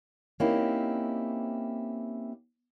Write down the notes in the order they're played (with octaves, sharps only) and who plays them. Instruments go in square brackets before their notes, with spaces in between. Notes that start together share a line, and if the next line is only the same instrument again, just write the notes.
[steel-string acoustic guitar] A#3 C4 C#4 D#4 E4 G4